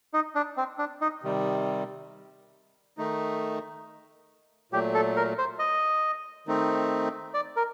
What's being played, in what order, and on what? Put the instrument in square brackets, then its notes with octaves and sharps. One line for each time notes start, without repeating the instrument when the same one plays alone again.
[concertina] D#4
D4
C4
D4
D#4
[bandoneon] C3 D#3 G3
D#3 A3 D#4
[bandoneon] A#2 F#3 A3 [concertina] G4
[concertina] A4
A#4
C5
D#5
[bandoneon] D#3 A3 C4 D#4
[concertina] D5
A#4